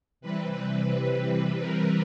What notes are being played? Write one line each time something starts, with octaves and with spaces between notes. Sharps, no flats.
C3 E3 G3 C4 B4
A#4